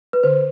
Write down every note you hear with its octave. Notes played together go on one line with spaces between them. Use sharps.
B4
D3 C5